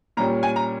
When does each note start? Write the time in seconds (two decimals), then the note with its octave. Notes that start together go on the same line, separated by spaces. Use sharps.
0.17 A#2 G3 C#4 A#5
0.43 G#5
0.56 A#5